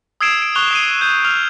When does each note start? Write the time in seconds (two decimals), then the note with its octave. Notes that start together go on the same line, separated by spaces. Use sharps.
0.21 D#6 E6 G#6 C7 D7 E7
0.42 D7
0.55 C#6 F#6 F7 G7
0.71 D#6 C7 D#7
1.01 G6
1.24 E6 F6 F7